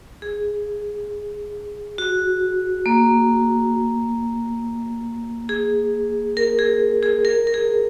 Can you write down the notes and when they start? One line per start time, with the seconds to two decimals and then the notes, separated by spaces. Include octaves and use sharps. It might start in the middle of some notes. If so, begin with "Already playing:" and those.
0.22 G#4
1.98 F#4
2.86 A#3
5.49 G#4
6.37 A#4
6.59 G#4
7.03 G#4
7.25 A#4
7.47 A#4
7.54 G#4